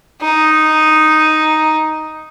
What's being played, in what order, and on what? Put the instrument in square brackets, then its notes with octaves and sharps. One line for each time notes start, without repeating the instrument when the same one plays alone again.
[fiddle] D#4